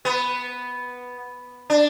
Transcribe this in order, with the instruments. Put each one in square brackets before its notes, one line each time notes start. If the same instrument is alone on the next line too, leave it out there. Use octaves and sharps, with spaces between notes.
[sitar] B3
D4